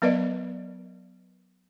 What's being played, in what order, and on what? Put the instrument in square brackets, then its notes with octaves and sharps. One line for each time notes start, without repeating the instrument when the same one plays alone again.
[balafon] F#3 B3 A#4 B4 D5 D#5